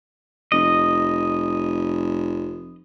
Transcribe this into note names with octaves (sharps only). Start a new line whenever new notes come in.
F1 D#5